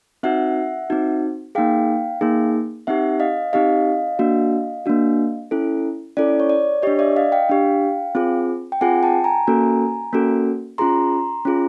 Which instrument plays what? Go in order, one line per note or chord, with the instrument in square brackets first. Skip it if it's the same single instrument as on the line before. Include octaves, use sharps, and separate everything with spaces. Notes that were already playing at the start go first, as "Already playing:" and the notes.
[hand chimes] C4 D#4 F#4 E5 F#5
C4 D#4 F#4
A#3 D#4 G#4 F5 G5
A#3 D#4 G#4
C4 D#4 G4 E5 F#5
D#5 F5
C4 D#4 G4 D#5 F5
A#3 D4 F#4
A#3 D4 F#4
C#4 E4 A4
C#4 E4 A4 D5
C#5
D5
D4 G4 C#5 D#5
D5 E5
D#5 F5
F5 G5
D4 G4
C4 F4 G#4
G5
C4 F4 G#4 F#5 G#5
G5 A5
G#5 A#5
A#3 C#4 F#4 A4
A#3 C#4 F#4 A4
C#4 F4 G#4 A#5 C6
C#4 F4 G#4